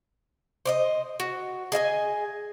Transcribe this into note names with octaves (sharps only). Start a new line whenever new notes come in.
C5 D5 D#5
F#4
G#4 D#5 E5 G#5